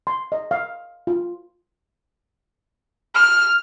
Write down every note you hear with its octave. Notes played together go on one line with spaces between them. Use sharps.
C6
D#5
F5
F4
F6